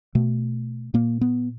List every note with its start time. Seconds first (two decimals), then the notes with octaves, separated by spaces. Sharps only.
0.15 B2 A3
0.94 A#2 A#3
1.21 B3